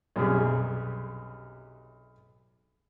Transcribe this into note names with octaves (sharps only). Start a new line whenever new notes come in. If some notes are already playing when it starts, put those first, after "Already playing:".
B1 F#2 C3 G3 G#4